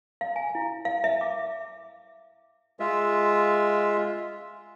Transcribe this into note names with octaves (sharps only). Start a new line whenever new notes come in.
F5
G#5
E4
F5
E5
D6
G#3 F4 E5